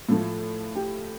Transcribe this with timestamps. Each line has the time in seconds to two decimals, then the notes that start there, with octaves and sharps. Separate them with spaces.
0.09 A2 F3 A3
0.75 G4